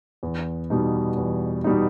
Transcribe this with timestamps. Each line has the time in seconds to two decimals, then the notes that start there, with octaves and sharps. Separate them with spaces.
0.23 E2
0.70 B2 G3 D#4
1.17 E2
1.64 B2 G3 D#4